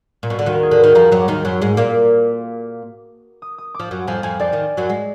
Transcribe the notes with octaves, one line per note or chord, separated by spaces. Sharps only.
A#2
B2
D3
D#2 D#3 F#4
A#4
G#4
D3
D#3 B4
F2 F3 A#5
F#2 F#3
D6
D#2 D#3
F#2 F#3
G#2 G#3
A#2 A#3
D6
D#6
D#6
D6
F3
F#2 F#3
F2 F3 G#5
F2 F3 G#5
F2 F3 D5
D#2 D#3
F#2 F#3
G#3